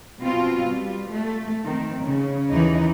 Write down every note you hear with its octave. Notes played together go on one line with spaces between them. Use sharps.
B2 C4 F4
G3
A3
D#3 C4
C#3
D#2 E3 D#4